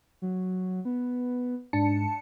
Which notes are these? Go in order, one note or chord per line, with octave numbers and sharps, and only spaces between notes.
F#3
B3
G#2 D4 A5 C#7